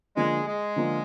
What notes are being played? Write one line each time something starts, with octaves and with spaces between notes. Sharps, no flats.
D3 F3 G#3 A#3 F4
G#3
D3 F3 A#3 F4